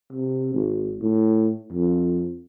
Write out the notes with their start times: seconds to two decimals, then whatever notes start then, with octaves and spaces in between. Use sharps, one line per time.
0.13 C3
0.54 G#1
1.02 A2
1.73 F2